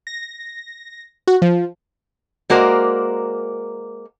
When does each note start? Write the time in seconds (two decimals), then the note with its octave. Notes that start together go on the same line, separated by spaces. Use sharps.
0.07 A#6
1.27 F#4
1.42 F3
2.50 G#3 A#3 F#4 A#4 C5 D5